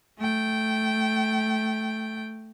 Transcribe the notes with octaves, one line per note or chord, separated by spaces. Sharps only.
A3 G5